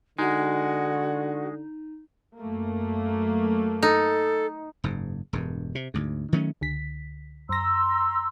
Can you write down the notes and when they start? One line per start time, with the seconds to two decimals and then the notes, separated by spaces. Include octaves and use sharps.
0.19 D3 G#3 D#4 F#4
2.38 F#2 A3 A#3
3.83 D#4 A4
4.84 F#1 G#2
5.33 E1 G2
5.75 C3
5.94 D2 G#2
6.33 D#3 F#3 A3 C#4
6.61 C#2 D3 B6
7.49 F#2 A#5 C6 E6 A#6